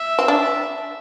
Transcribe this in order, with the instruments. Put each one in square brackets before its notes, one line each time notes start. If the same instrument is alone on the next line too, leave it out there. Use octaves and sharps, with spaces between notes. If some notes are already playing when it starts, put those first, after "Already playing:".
Already playing: [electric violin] E5
[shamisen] C4
D4